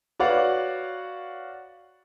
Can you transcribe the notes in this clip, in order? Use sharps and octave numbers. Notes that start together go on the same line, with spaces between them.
F#4 B4 C#5 D5 F5 F#5